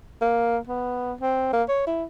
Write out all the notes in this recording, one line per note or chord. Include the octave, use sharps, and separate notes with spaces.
A#3
B3
C4
A#3
C#5
E4